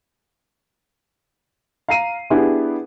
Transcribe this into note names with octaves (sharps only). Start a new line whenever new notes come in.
F5 A#5 C7 D#7
B3 D4 E4 G4 G#4 B4